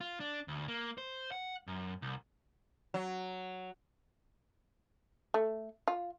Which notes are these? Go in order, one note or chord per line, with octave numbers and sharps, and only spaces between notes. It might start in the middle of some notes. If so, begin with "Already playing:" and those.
F4
D4
D2
A#3
C5
F#5
F#2
C2
F#3
A3
F4